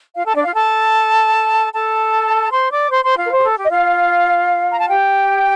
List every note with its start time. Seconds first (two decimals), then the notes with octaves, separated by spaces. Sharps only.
0.15 F4 F5
0.25 A4 A5
0.35 D4 D5
0.45 F4 F5
0.55 A4 A5
1.73 A4 A5
2.51 C5 C6
2.72 D5 D6
2.91 C5 C6
3.04 C5 C6
3.17 F4 F5
3.25 A#4
3.30 C5
3.38 G4
3.44 A4
3.57 G4
3.64 D#5
3.69 F4 F5
4.72 A#5
4.80 A5
4.88 G4 G5